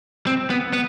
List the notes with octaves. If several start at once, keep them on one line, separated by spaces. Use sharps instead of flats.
C4
B3
B3